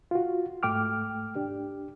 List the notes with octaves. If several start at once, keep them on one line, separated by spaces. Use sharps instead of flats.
F4 F#4
G#2 A3 G5 D6 F6
D4 G4